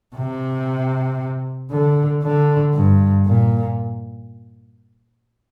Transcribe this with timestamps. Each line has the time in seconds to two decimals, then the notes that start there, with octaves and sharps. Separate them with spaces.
0.16 C3
1.71 D3
2.23 D3
2.74 G2
3.26 A#2